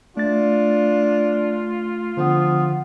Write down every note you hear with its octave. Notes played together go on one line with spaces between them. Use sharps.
A3 D4 F4 A6
D3 F3 B3